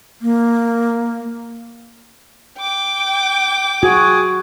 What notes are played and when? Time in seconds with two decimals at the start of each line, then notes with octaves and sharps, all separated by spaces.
0.22 A#3
2.58 G5 D6
3.83 F#4 G#4